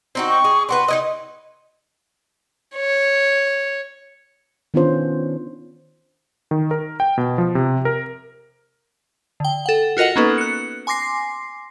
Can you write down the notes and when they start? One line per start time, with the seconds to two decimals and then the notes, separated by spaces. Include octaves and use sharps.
0.15 C4 D#4 F#4
0.29 C#6
0.44 G#4
0.69 D4 F#4 B4 C6
0.88 D#4 E4 D#5
2.74 C#5
4.74 D#3 B3 C#4 D4 F4 C5
6.51 D#3
6.71 A#4
7.00 G5
7.18 B2
7.38 F3
7.55 C3
7.85 A#4
9.40 D3 G5
9.66 A4 F#5
9.97 F4 F#4 A#4 D#5 F#5
10.16 A#3 B3 C#4 D#4 A4 B4
10.38 F#6 C#7
10.87 G#5 C6 D6 A#6 C7